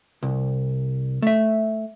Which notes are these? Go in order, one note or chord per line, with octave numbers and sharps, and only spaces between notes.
C2
A3 E5